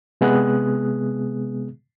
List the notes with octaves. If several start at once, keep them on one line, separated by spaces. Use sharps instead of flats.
C3 G#3 B3 G#4 D#6 F#6